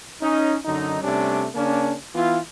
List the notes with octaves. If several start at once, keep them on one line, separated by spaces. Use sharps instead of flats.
C#4 D#4
F#2 D3 F#3 D#4
C3 G3 A3 C#4 D4
C#3 A#3 C#4 D4
E3 B3 E4 F4